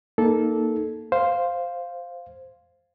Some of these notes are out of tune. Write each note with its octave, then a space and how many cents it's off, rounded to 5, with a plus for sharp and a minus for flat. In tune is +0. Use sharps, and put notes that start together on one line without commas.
A#3 +0 D#4 +0 A4 -15
C5 +0 F5 +0